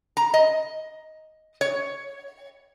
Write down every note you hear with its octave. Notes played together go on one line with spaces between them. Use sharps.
A#5
D#5
C#5